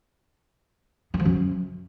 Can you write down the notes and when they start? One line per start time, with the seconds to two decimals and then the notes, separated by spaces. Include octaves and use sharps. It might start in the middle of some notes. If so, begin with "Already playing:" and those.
1.14 D#3
1.20 F3
1.25 F#2